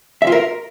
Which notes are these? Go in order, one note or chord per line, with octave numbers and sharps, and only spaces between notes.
E5
F4
A#4